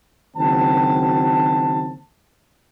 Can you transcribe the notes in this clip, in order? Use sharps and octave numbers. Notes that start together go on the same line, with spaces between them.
F#1 D#3 C4 F#4 A5